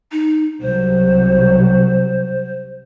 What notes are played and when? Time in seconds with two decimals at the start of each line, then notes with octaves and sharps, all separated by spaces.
0.12 D#4
0.62 C2 F#3 C5